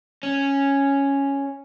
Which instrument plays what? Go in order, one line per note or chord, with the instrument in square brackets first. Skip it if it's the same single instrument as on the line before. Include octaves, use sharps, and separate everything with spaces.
[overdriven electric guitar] C#4